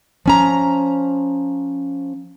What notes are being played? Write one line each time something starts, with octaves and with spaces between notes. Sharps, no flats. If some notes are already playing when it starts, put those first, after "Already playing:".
F3 C#4 A#5